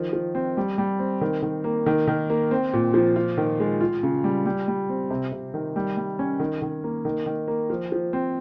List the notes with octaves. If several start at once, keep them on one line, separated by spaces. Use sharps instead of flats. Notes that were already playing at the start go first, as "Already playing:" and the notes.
Already playing: D#3 F3
F3
C4
G3
G3
C4
D#3
D#3
A#3
D#3
D#3
A#3
C4
A#2
F3
F4
D#3
G#3
F4
C#3
G3
G3
G3
C4
C3
C3
D#3
G3
G3
C#4
D#3
D#3
A#3
D#3
D#3
A#3
F3
F3
C4